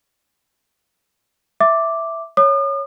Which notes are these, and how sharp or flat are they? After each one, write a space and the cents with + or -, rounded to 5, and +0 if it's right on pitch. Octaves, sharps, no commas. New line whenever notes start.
E5 +0 D6 +0
C#5 +0 D#6 -45